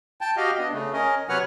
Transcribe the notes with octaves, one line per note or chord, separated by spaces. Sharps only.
G5 A5
F#4 G4 D#5 F5
B3 D4 D#5
C#3 A3
C#4 A#4 D#5
C3 F#3 B4 C#5 F#5 F6